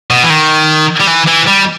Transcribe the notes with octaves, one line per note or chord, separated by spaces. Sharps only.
B2
E3
D#3
G3
E3
E3
G3